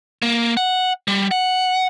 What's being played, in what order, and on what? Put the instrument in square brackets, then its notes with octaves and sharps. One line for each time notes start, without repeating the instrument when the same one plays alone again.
[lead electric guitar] A#3
F#5
G3
F#5